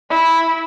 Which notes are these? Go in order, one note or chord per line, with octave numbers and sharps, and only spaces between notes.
E4